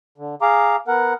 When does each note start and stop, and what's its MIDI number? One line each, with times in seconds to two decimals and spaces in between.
0.18 0.35 50
0.42 0.76 68
0.42 0.76 77
0.42 0.76 82
0.42 0.76 86
0.88 1.14 59
0.88 1.14 70
0.88 1.14 78